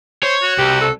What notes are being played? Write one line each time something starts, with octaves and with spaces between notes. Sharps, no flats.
C5 C#5
F#4
C2 G4
A4